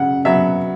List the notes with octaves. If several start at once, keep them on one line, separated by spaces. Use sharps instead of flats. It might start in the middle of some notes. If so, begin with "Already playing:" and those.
Already playing: C#3 F#3 F#5
F#3 B3 E5